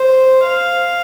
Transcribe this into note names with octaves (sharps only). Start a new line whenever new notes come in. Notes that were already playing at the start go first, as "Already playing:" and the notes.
Already playing: C5
F5